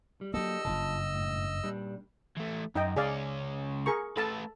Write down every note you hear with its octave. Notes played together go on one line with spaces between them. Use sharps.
G3
F#3 A#3 D4 G4 A4 D#5 E6
F#1 G2 C#3 F4 A5
A2
A#2 G3 D4
E3 A3
F#2 D#4 D#5 G5
C#2 C#4 G#4 D5 F5
G#4 A#4 C#6
A3 A4 B4 A5